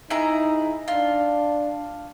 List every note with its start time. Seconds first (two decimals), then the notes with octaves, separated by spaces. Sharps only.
0.10 D#4 E4 G#4 A#5
0.88 D4 F4